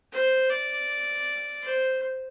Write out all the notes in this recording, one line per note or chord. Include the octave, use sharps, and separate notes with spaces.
C5
D5
C5